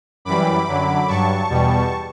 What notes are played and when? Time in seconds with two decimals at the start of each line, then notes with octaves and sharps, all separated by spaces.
0.25 F#2 E3 G3 B5 D6
0.66 F#2 D3 F#3
1.08 G2 F#3 A5 C#6
1.49 E2 B2 G3